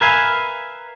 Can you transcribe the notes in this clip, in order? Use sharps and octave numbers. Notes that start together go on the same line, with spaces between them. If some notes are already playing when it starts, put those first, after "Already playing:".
A#4 B4 E5 F5 G#5